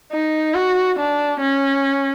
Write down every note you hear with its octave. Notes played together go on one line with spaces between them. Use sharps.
D#4
F#4
D4
C#4